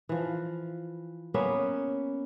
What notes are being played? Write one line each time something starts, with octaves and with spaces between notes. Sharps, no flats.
E3 F3
A#3 B3 C#4 E5